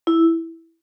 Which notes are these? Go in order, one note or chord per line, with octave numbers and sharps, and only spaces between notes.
E4